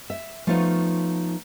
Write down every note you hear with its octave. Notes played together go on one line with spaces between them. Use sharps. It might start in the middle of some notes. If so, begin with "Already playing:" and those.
E5
F3 A3 B3 D#4 F4 C#5